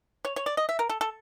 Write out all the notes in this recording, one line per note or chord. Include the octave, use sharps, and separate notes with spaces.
C#5
C#5
D5
D#5
E5
A#4
A4
A4